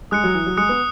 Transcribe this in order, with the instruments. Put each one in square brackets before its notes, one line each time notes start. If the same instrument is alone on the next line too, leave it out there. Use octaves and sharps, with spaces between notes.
[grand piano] G#3 [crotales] D#6 F#6 C#7
[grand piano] F#3
E3
F#3
[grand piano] G#3 [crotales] D#6 F#6 C#7
[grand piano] B3